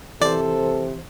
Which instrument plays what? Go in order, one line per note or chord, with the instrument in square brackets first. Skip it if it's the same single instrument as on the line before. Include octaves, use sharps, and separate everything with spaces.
[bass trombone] C3 [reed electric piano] E3 C5 [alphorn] A4 [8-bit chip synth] D5